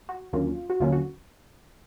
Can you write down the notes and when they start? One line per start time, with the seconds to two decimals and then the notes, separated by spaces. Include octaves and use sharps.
0.09 F#4
0.33 D#2 D3 F#3 A#3 C#4 F4
0.70 F#4
0.80 D#2 D3 F#3 A#3 C#4 F4
0.92 F#4